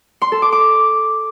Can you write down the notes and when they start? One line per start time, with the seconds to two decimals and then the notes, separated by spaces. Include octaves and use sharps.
0.22 C6
0.32 A4
0.42 D6
0.52 D6